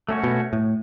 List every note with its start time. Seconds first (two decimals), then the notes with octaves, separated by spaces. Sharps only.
0.09 A3 C#4 F#4 C#5
0.24 B2
0.53 A2